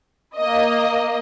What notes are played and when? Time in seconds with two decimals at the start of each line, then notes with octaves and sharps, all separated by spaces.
0.37 A#3 D#5